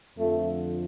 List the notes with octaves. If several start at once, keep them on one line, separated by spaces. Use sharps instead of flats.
F2 D3 F3 A3